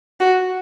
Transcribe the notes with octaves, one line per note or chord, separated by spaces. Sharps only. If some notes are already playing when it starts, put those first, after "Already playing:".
F#4